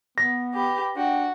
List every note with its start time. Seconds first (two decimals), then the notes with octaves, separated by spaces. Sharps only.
0.18 B3 A#6
0.55 G4 B4
0.96 D4 F#4 G5